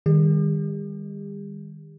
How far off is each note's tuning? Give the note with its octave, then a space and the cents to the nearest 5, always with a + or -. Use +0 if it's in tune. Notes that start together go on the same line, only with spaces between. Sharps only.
D#3 -10 G3 +35 G4 +45